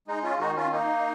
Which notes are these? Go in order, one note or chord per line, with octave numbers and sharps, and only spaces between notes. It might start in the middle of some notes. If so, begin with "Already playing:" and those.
G#3 D#4
C#4 F4
D#3 D#4 F#4
C#4 F4
A#3 D#4